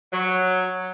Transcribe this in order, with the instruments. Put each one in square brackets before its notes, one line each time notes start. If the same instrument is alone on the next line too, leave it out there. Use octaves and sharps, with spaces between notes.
[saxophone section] F#3